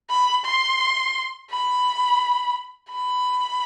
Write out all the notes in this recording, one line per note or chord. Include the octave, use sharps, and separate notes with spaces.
B5
C6
B5
B5